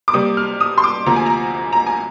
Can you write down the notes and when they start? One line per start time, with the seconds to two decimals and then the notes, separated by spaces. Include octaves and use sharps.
0.08 D6
0.13 C3 G3 A#3 D#6
0.37 F6
0.60 D#6
0.78 C6
0.84 D6
1.06 D2 C3 F3 A#3 A#5
1.16 G#5
1.26 A#5
1.73 A#5
1.86 G#5